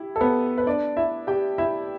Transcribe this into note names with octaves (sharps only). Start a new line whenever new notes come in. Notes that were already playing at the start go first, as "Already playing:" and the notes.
Already playing: E4 G4
A4
B3 B4
B4
D4 D5
E4 E5
G4 G5
E4 E5